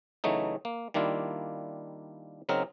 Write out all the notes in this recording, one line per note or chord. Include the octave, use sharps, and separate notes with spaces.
C#3 E3 F#3 A3 D#4
A#3
D#3 G3 A#3 D4 E4 F4
C#3 F#3 C4 D#4 A#4